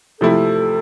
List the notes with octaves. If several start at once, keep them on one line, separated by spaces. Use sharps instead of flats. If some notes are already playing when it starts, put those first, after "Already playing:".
C3 F3 A3 E4 A4